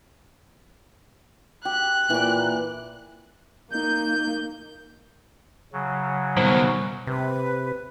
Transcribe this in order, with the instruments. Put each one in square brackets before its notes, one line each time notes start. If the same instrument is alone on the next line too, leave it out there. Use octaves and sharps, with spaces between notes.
[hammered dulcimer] G4 [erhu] F#6
[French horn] A#2 [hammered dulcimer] E3 D6
[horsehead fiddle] A#3 D#4 [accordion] G6
[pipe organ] C#3 F#3
[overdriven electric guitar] B2 D#3 [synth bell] G3
[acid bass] C3 [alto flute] B4